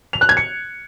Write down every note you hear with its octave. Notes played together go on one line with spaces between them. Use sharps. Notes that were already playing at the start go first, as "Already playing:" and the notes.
F7
F#6
G#6
C#7